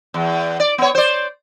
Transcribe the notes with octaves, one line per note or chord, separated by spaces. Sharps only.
E2
D5
B3 C#5
C5 D5